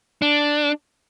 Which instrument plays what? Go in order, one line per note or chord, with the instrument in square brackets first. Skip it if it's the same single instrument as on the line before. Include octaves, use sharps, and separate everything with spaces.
[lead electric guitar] D4